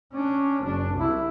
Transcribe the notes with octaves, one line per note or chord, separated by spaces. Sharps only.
C#4 D4
F#1 D4
C2 E4